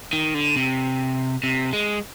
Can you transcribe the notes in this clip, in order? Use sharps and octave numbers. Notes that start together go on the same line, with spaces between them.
D#3
D3
C3
C3
G#3